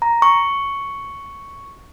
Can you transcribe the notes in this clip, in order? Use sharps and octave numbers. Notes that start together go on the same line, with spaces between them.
A#5
C#6